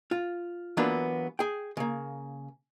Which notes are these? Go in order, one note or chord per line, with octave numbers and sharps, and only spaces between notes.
F4
E3 F#3 A#3 B3 D4 F4
G#4 G5
C#3 A#3